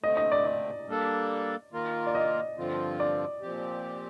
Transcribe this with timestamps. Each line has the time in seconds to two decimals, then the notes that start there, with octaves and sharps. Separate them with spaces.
0.03 D3 A3 C4 D#5
0.17 D#5
0.32 D5
0.45 D5
0.87 G3 A#3 D4 A4
1.73 D#3 A#3 F4 A#4
2.06 D5
2.15 D#5
2.57 G2 D3 F3 C4 F4
3.00 D5
3.41 A#2 F3 C4 G4